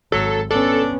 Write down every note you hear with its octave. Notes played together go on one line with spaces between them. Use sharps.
G#1 F#3 A4
B3 C#4 D4 A4